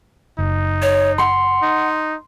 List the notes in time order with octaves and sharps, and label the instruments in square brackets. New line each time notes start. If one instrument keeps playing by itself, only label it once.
[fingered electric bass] F#1 [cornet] D#4
[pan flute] C#5
[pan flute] F#5 [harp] C6
[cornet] D#4